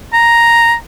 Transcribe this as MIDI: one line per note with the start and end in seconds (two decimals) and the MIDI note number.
0.13 0.74 82